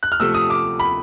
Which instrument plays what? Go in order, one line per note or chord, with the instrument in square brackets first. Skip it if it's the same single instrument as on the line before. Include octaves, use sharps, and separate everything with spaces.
[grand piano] F#6
F6
C3 F3 A3 E6
D#6
D6
B5